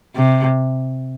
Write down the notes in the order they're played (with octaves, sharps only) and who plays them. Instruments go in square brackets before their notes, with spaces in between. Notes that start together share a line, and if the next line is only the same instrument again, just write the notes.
[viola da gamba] C3